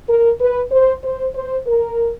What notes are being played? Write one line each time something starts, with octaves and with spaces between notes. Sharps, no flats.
A#4
B4
C5
C5
C5
A#4